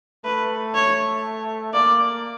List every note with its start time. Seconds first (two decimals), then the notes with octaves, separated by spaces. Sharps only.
0.25 A3 B4
0.75 C#5
1.73 A#3 D5